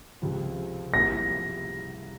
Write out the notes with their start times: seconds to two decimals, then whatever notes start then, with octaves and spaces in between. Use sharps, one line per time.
0.22 C#2 C3 F3
0.93 C2 C3 F3 A#3 E4 A#6